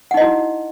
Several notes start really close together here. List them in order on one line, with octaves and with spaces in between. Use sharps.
F#5 D#4 D#5 E4 F#4